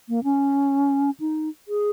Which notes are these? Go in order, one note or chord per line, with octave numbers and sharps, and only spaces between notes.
A#3
C#4
D#4
G#4